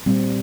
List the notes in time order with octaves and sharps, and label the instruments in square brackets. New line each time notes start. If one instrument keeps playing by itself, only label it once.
[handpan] A#2 G3 C4